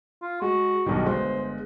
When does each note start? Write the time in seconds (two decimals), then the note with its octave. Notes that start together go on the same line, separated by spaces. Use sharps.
0.22 F4
0.42 G#3 F#4
0.86 B1 G2 D#3
1.06 G1 G#3 C5